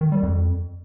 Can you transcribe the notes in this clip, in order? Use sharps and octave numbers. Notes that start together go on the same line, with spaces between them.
D#3
G3
F2